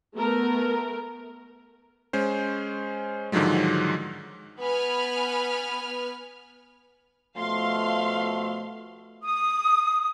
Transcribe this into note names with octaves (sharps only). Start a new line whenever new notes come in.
A3 B3 A#4
G#3 C#4 C5
G#2 D3 D#3 F3 F#3 G#3
B3 B4 G#5 B5 F6
B2 F3 A3 F5 C6
D#6